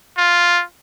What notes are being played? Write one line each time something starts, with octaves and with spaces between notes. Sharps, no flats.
F4